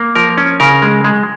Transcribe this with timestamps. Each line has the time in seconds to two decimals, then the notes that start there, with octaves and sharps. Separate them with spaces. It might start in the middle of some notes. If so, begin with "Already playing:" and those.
Already playing: A#3
0.15 F3 A#4
0.37 C#4
0.60 C#3 A#4
0.82 G#3
1.04 G#3